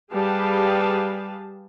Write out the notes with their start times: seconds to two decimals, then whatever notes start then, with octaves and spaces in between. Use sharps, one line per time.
0.13 G3 G4 G#4 B4 F5 A5